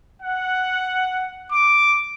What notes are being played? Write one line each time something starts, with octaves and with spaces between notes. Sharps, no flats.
F#5
D6